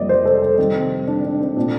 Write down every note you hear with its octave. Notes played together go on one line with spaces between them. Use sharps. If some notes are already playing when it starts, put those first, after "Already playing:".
Already playing: F2 C3 G3 A#3 D5 D#5
C5
A4
A4
C3 D#3 G3 C4
D4
D4
C4
A#2 A3 D4